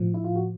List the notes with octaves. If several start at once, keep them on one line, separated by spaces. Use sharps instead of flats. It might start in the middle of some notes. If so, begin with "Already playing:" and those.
Already playing: A2 F3
E4
F4
F#4